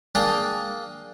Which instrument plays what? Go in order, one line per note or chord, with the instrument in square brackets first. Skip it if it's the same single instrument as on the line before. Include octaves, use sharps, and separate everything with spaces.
[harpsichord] A#3 D4 G#4 D5 F5 G5